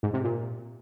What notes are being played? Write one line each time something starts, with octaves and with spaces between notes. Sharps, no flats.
G#2
C3
A#2